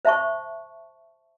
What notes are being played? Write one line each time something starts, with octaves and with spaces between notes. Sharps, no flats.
C5 E5 A5 C#6